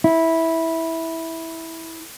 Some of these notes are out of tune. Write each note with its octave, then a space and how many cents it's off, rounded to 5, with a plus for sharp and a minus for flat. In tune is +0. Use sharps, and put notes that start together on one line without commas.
E4 -10